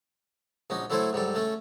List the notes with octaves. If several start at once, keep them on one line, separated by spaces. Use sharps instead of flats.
A#1 C#4 D#4 F#4
F#3 A3 E4 A4 C5 C#5
G#2 F#3 G3 A4
A3 C#4 A4